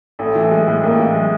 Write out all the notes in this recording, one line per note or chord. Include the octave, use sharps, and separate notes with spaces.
A1 A3
E3
G#3
A2
A1 A#3
E3
G#3